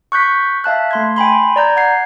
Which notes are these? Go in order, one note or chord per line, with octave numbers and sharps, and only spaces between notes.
C#6 F#6 G6 B6
E5 F5 A5 F#6
A3 C6 G#6
G5 G#5 B5 C6
D5 A#5 G6 G#6
F#5 G#6 C7